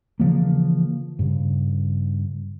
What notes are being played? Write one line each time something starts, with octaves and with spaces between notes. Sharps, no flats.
C#3 E3 F3 A#3
G2 C#3